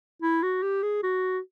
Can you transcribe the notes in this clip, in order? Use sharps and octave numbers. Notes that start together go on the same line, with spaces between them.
E4
F#4
G4
G#4
F#4